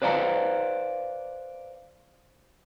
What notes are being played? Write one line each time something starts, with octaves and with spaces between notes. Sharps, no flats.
B4 C5 D5 F5 A#5